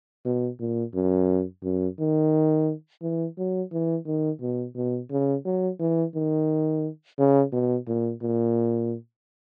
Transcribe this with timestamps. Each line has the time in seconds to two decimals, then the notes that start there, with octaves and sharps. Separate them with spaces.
0.25 B2
0.60 A#2
0.94 F#2
1.64 F#2
1.99 D#3
3.02 E3
3.38 F#3
3.73 E3
4.06 D#3
4.41 B2
4.76 B2
5.11 C#3
5.45 F#3
5.80 E3
6.15 D#3
7.19 C#3
7.53 B2
7.88 A#2
8.22 A#2